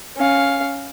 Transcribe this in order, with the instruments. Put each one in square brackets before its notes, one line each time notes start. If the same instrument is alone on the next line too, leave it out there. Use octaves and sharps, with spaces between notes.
[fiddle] C#4 F5